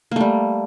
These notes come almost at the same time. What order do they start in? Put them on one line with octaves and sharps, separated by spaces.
A#3 A3 G3